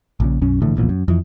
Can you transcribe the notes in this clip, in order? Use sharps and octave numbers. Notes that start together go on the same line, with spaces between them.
A#1 A#2 C#3
B1 F#2 C#4
A#1 A2 D3 E3
D1 A#1 E2 A#2
F#2
F2 E3